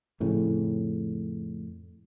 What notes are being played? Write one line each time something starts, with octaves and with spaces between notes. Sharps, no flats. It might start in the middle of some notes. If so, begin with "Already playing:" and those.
F2 A2 C#3